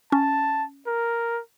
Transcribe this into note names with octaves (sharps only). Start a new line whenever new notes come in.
C#4 A5
A#4